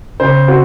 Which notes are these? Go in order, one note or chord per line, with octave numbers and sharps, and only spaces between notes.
C#3 C5
C4 F#4